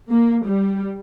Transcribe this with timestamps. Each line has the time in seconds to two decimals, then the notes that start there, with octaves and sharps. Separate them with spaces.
0.11 A#3
0.46 G3